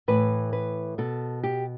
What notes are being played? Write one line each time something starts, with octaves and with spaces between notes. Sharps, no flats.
A2 E3 B4
B4
B2 A4
G4